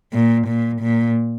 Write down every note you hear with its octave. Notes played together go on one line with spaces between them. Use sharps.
A#2
A#2
A#2